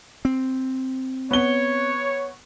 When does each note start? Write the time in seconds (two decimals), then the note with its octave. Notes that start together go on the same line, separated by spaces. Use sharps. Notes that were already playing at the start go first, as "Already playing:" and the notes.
0.25 C4
1.31 B3 C#5 G7